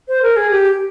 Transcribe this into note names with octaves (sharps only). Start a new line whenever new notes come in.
C5
A#4
G#4
G4